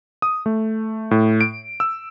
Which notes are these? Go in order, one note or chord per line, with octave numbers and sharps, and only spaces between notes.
D#6
A3
A2
D7
E6